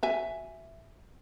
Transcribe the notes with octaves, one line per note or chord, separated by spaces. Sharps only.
F#4 E5 G#5